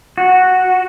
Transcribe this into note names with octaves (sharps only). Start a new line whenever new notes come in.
F#4